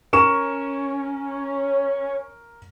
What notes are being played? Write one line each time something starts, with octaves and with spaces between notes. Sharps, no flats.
C#4 A#4 C#6 E7